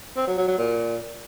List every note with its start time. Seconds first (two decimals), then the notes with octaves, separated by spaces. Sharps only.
0.17 C4
0.27 F#3
0.38 F#3
0.48 F#3
0.58 A#2